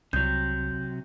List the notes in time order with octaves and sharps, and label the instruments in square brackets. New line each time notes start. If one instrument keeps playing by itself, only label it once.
[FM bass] C2 [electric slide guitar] C3 F#3 [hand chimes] G6